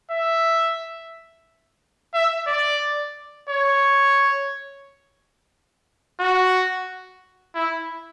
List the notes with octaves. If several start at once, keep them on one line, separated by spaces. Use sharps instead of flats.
E5
E5
D5
C#5
F#4
E4